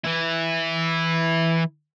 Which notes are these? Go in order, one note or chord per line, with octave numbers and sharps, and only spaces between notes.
E3 E4